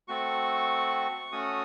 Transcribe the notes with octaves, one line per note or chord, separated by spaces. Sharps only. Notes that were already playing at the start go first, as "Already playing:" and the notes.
A3 C4 F#4 C#6
A3 C#4 F#4 D#6